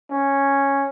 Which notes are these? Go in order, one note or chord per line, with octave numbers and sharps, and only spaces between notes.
C#4